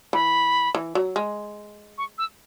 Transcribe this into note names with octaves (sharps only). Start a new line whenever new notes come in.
E3 B5
E3
F#3
G#3
C#6
E6